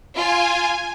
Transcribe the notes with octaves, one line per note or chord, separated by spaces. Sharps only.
F4 G#5